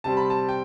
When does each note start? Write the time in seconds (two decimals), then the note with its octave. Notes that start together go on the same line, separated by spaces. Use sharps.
0.04 C3 G3 C4 A5
0.17 B5
0.30 A5
0.49 G5